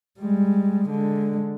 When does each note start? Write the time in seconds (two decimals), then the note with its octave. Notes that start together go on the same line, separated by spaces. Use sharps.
0.20 G3 G#3
0.89 D3 G#3